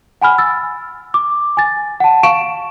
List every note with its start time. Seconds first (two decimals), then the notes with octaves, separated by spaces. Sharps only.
0.22 F#5 G#5 B5 F6
0.38 E6 A6
1.14 D6
1.57 G#5 A6
2.00 F#5 A5
2.23 F5 C#6 D7 E7